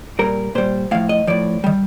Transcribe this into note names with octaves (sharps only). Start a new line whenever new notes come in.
A#2 G3 A#4
A#2 G3 C5
A2 F3 F5
D#5
A2 F3 D5
D#3 G3